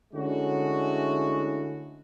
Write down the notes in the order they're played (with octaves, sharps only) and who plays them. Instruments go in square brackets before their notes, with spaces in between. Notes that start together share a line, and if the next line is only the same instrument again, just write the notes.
[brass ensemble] D3 G#3 A3 C#4 E4 F#4